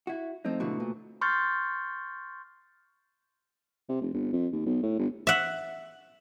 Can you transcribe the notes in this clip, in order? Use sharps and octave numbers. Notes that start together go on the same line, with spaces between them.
E4 F#4
F3 A3 C4 D#4
G#2 B2 D3 E3 F#4
A#2
C6 C#6 F6 G6 A6
C3
F1
G1
F2
D#2
B1
A2
G1
E5 F#5